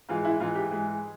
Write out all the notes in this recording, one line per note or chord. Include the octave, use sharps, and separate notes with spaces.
G#2 E3 G#3 F4
E4
G#2 E3 G#3 F4
G4
G#2 E3 G#3 G#4